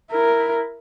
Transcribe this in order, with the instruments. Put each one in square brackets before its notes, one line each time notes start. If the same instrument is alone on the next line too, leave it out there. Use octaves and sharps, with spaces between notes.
[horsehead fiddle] E4 A#4